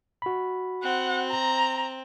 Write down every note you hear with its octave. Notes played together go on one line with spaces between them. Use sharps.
F#4 B5
C4 F#5
A#5